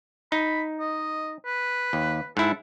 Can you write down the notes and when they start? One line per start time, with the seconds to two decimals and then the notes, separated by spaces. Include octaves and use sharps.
0.32 D#4 B5
0.80 D#5
1.46 B4
1.93 D#2
2.37 G#2 E4 A4